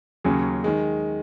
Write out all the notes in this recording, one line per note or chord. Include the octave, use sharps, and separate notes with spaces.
D#2 C#3 F#3 C#4 G#4
D#3 G#3